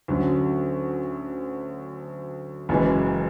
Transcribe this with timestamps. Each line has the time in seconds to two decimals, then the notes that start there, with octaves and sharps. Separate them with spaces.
0.08 D2 D3 F#3 C#4
2.69 F#1 F#2 E3 G#3